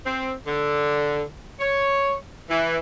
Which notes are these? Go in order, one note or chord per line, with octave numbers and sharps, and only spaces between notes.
C4
D3
C#5
E3